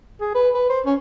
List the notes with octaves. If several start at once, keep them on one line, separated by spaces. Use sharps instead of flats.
G#4
B4
B4
C5
C#4